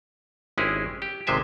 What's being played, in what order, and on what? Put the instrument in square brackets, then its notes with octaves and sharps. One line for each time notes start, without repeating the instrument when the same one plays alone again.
[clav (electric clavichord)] G#1 G#3 C#4 E4 G4 G#4
G4
G#1 C3 G#3 C5 E5 G#5